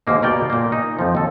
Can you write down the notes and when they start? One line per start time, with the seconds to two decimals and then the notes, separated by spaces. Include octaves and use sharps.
0.07 D#2 G#2 A#3 D#4
0.22 B2 A#4 D5 G5
0.50 A#2 A#3
0.72 D#4
0.99 F2 F3
1.15 D#2 A4